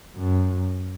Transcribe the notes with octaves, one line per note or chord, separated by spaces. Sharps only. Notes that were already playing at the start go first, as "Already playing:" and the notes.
F#2